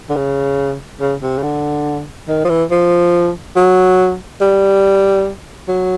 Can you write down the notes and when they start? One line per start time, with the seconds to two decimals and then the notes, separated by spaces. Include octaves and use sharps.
0.09 D3
0.16 C#3
1.00 C#3
1.22 C3
1.38 C#3
1.43 D3
2.28 D#3
2.45 F3
2.49 E3
2.71 F3
3.56 F#3
4.41 G3
5.68 F#3